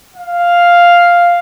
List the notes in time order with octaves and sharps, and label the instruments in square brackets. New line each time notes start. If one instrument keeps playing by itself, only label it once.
[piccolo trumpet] F5